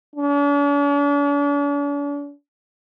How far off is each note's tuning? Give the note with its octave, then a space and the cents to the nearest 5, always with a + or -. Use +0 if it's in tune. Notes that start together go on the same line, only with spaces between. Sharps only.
D4 -45